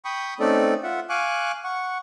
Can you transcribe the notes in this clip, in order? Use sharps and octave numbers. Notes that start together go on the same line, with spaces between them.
G5 B5 C#6 D#6
A3 C4 C#4 D#4 A4 D5
F4 E5 F#5
F5 G#5 C#6 D6 F#6
F#5 C#6